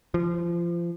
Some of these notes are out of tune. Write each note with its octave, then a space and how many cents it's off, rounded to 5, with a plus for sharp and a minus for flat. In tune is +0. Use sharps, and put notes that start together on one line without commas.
F3 -25